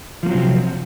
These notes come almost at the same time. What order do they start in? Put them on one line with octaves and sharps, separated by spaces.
F3 A#3 F#3 C4 C3